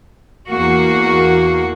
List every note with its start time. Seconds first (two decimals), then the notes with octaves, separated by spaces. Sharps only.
0.48 E2 A#3 F#4